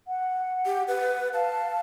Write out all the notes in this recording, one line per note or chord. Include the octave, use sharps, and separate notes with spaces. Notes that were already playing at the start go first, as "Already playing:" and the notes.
F#5
G4
B4 F#5
F5 A5